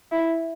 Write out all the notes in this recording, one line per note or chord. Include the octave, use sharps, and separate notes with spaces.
E4